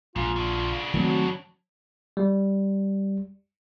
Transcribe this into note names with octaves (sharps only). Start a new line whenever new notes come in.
A#1 G#2 F4
C#3 D4
D#3 F#3 A3 C4 F#4
G3